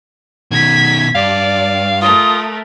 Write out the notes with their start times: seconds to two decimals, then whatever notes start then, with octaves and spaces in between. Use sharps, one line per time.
0.51 B2 D#3 G#6 B6
1.15 G2 D5 F5
2.02 A3 F4 A#4 D#6